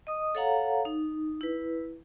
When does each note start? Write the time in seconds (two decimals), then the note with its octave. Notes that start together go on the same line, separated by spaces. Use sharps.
0.07 D#5 D#6
0.35 A4 C#5 F5 F#5 A#5
0.85 D#4
1.41 E4 B4